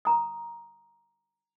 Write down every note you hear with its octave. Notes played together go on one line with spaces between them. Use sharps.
A#5 D#6